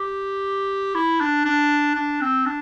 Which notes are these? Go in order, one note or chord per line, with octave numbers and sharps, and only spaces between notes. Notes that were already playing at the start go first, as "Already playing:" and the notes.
Already playing: G4
E4
D4
D4
D4
C4
D4